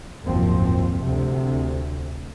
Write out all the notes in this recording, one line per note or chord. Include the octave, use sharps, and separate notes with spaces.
F#1 D#2 G#2 F3 C4
D2 C3